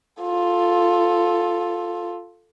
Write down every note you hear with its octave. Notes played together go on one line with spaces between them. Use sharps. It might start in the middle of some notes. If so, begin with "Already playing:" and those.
F4 A4